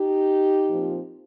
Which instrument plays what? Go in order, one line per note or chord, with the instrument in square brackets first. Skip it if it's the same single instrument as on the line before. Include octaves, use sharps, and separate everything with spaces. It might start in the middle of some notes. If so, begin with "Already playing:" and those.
Already playing: [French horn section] D#4 G4
A#2 F3 C4